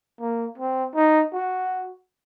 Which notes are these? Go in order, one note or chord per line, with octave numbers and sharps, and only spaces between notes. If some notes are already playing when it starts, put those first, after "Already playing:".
A#3
C4
D#4
F#4